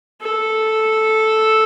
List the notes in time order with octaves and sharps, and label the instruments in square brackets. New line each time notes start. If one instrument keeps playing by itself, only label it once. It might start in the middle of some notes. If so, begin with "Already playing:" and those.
[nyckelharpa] A4